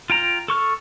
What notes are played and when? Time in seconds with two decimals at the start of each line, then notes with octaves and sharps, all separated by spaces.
0.10 F4 G5 A#5
0.48 A4 C#6 F6